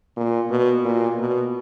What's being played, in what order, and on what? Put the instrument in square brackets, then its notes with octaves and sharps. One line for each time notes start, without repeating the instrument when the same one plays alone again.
[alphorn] A#2
B2
A#2
B2